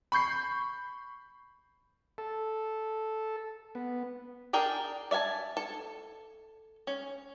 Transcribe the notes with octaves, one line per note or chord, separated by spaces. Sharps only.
B5 C#6 G6 C7
A4
B3
D4 G#4 A#4 G5
D5 E5 F5 G#5 A5
A4
C#4